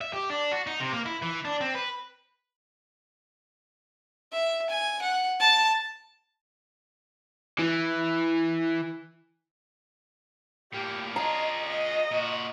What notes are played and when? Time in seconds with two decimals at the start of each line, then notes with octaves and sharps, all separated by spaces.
0.01 E5
0.13 G4
0.30 D4
0.52 F#4
0.67 D#4
0.80 C3
0.93 A#3
1.06 E4
1.22 E3
1.45 D4
1.61 C4
1.75 B4
4.32 E5
4.70 G#5
5.02 F#5
5.40 A5
7.59 E3
10.73 A2 A#3 G4
11.16 F4 G#4 D#5 A#5
11.66 D#5
12.11 A#2 F#4